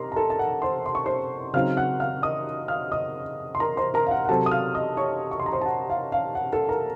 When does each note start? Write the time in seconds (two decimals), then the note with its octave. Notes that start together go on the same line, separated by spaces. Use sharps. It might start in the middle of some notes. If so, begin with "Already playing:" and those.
Already playing: C3 A#4 D#5 A#5 C6
0.12 A#5
0.16 A4 A5
0.30 A5
0.39 F#5
0.62 C5 C6
0.86 C6
0.95 C#6
1.06 C5 C6
1.53 C#3 F#3 C4 D#4 F5 F6
1.77 F#5 F#6
2.00 F5 F6
2.23 D#5 D#6
2.68 F5 F6
2.92 D#5 D#6
3.55 C6
3.60 A#4 A#5
3.77 C5 C6
3.94 A#4 A#5
4.07 F5
4.11 F#5
4.25 F#5
4.29 C3 F#3 C4 A4 A5
4.46 D#6
4.51 F5 F6
4.74 D#5 D#6
4.97 C#5 C#6
5.31 C#6
5.40 C6
5.46 A#5
5.52 C5 C6
5.61 A5
5.66 F#5
5.90 F5
6.12 F5
6.35 F#5
6.53 A4 A5
6.69 A#4 A#5